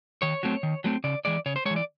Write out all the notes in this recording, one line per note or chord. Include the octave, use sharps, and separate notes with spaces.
D#3 C#5
F#3 A3 C4
D#3
F#3 A3 C4
C#3 D5
E3 G#3 D5
C#3 C#5
C5
G#3 C#5
E3
D5